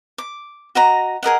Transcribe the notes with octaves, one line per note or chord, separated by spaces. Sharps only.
D6
F#4 D#5 A#5
G#4 A#4 D#5 F#5